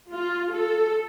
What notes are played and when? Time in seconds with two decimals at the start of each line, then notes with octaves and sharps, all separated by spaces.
0.10 F4
0.53 A4